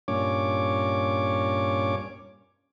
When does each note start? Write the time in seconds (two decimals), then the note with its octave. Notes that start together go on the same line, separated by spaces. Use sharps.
0.08 G2 A#2 C#4 C#5 D6